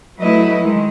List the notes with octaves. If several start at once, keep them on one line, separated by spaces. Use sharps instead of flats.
F#3 A3 E4 B4 D#5
D#3 G#3